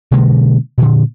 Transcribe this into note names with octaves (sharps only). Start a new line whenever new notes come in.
B2 D3 G#3 A#3
A#2 D3